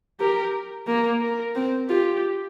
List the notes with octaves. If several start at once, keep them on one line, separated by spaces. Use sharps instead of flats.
G4 A#4
A#3 A#4
A#4
C4
F4 G4